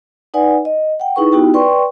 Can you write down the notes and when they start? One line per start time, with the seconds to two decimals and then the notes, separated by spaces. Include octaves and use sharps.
0.34 D#4 B4 D5 F#5 G#5
0.65 D#5
1.00 F#5 G5
1.16 D#4 E4 G#4 B4 C#6
1.32 B3 D#4 E4 F#4 G4 G5
1.54 B4 D5 G5 C6 C#6